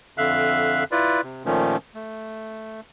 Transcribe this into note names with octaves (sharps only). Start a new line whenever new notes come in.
F2 D3 E5 F5 F#6
E4 F4 B4 D5
C3
A#2 D#3 F3 A3 C#4
A3